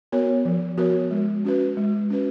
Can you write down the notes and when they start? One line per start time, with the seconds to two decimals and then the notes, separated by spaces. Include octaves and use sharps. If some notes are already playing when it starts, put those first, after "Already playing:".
0.12 B3 F#4 A#4 C#5
0.45 F3
0.78 B3 F#4 A#4 C#5
1.11 G#3
1.45 C#4 F#4 B4
1.77 G#3
2.10 C#4 F#4 B4